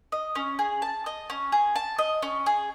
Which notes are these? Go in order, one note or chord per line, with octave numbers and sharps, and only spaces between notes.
D#5
C#4
G#4
A5
D#5
C#4
G#4
A5
D#5
C#4
G#4